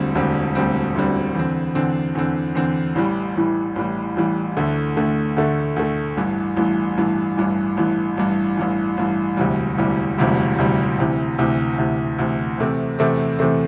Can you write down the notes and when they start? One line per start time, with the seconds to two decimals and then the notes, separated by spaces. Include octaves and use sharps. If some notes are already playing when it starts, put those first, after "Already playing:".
Already playing: E1 D2 D3 G3 C4
0.15 E1 D2 D3 G3 C4
0.55 E1 D2 D3 G3 C4
0.95 E1 D2 D3 G3 C4
1.35 E2 D3 C4
1.75 E2 D3 C4
2.15 E2 D3 C4
2.55 E2 D3 C4
2.95 A1 A2 E3 G3
3.36 A1 A2 E3 G3
3.76 A1 A2 E3 G3
4.16 A1 A2 E3 G3
4.57 D2 D3 A3
4.97 D2 D3 A3
5.36 D2 D3 A3
5.76 D2 D3 A3
6.17 A1 G2 E3
6.57 A1 G2 E3
6.98 A1 G2 E3
7.37 A1 G2 E3
7.77 A1 G2 E3
8.17 A1 G2 E3
8.57 A1 G2 E3
8.97 A1 G2 E3
9.37 E1 D2 C3 E3 G3
9.78 E1 D2 C3 E3 G3
10.18 E1 D2 C3 E3 G3
10.58 E1 D2 C3 E3 G3
10.98 D2 C3 E3
11.38 D2 C3 E3
11.78 D2 C3 E3
12.18 D2 C3 E3
12.58 E2 C3 A3 C4
12.99 E2 C3 A3 C4
13.39 E2 C3 A3 C4